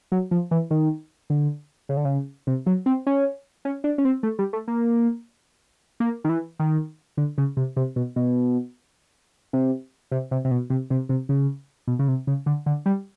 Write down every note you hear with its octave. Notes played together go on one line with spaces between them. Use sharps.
F#3
F3
E3
D#3
D3
C#3
D3
C#3
C3
F#3
C4
C#4
C#4
D4
C#4
C4
A3
G3
A3
A#3
A#3
D#3
E3
D#3
D3
C#3
C3
C3
B2
B2
C3
C3
C3
C3
B2
C3
C3
C3
C#3
B2
C#3
C3
C#3
D3
D3
G3